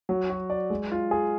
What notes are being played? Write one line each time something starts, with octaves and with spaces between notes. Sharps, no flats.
F#3
F#4
D5
G#3
F4
G#4